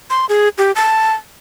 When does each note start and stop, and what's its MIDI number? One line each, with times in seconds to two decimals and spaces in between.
0.10 0.26 84
0.29 0.49 68
0.58 0.72 67
0.76 1.14 81